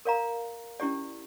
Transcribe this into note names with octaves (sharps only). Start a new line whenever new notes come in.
A#4 D5 F5 A#5
C#4 E4 G4 D5